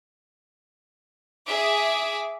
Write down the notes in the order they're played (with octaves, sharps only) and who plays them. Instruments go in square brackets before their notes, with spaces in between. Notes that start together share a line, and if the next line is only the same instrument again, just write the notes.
[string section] G#4 E5 D6